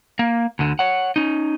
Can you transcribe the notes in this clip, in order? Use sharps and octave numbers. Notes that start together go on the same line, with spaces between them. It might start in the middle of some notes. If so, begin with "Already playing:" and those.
A#3
D2 D3
C#5 F#5
C#4 D#4